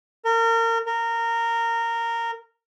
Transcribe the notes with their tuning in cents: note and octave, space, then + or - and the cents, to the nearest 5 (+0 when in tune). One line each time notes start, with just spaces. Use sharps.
A#4 -30
A#4 -15